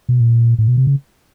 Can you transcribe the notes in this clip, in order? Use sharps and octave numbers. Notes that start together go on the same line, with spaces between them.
B2
A#2
A2
B2
C3
C#3